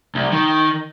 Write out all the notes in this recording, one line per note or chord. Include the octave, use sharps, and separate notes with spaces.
C2
D#3